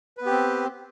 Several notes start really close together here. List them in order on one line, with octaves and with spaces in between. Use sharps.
B4 B3 G4 C4